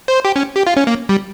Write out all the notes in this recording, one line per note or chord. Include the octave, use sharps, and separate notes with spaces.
C5
G4
C#4
G4
F4
C#4
A#3
G3